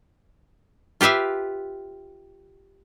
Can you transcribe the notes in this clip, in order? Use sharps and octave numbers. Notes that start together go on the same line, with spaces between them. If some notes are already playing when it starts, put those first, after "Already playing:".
F4 G4 B4 E5 F5